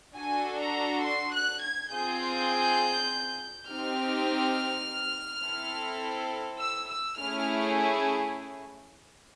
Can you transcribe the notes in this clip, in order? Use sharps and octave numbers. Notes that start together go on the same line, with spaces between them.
D4 F#4 A4 G#5
A#5
C6
F#6
G#6
C4 F4 G#4 G6
C4 D#4 G4 F6
C4 E4 A4
E6
E6
A3 C#4 E4 G#4 F6